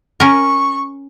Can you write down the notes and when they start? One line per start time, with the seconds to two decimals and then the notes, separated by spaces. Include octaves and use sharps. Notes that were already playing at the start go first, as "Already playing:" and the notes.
0.20 C#4 A#4 C#6